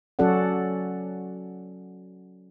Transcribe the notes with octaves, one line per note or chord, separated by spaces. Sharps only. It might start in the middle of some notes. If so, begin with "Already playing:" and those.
F#3 C#4 F#4 A4 D5 F#5